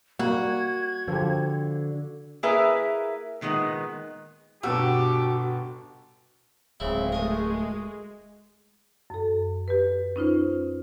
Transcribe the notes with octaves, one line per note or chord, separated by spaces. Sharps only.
G3 A#3 F#4 G#6
D3 F3 G4
A#3 E4 G#4 A#4 B4 E5
A#2 D#3 G#3 B3
G1 B2 F#4 G4 E6
D1 C#3 G#3 C4 E4
A3 A#4 G#5
F#2 A4
G4 B4
C#4 D#4 F4 C5